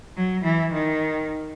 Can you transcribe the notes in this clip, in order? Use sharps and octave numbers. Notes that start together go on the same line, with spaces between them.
F#3
E3
D#3